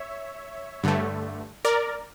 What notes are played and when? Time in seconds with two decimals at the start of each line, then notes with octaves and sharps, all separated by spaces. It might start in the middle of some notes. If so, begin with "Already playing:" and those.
Already playing: C#5 E5
0.83 G2 D3 A3
1.65 A#4 D5